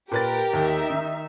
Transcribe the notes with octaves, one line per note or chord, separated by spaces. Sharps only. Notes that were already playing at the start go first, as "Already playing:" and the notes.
A#2 G4 A#4 B4 A6
D#2 D#4 E5
D#3